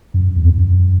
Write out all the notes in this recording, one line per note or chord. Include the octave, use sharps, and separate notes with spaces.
F#2
E2
F#2